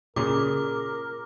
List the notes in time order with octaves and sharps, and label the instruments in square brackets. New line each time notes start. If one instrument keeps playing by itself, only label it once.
[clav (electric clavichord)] A#2 C#3 [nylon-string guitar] G#4 [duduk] A#4 [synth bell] D6